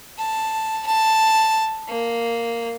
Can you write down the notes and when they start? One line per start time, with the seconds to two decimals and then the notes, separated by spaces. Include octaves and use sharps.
0.19 A5
0.86 A5
1.88 A#3